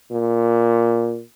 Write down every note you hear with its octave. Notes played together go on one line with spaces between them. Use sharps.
A#2